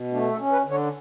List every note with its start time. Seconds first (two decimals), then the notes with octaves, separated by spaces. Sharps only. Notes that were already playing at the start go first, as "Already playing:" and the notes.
Already playing: B2
0.12 A3 D4
0.32 A4
0.38 C#4
0.52 B4
0.65 D3
0.70 C#5